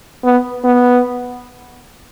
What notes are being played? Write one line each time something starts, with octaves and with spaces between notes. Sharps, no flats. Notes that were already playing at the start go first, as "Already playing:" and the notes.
B3
B3